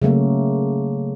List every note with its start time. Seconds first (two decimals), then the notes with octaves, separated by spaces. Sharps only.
0.02 C#3 F#3 A3 A#3